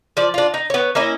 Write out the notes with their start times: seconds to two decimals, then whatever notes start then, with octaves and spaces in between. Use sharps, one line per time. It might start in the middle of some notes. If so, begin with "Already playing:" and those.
0.17 F3 D5
0.34 D4 F4
0.54 D#4
0.70 B3 C#5
0.95 A#3 C#4 E4 D#5